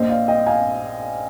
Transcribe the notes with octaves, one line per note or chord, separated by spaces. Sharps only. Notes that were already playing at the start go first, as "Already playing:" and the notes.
Already playing: A#1 A#2 C5 D#5
D5 F5
D#5 G5
F5 G#5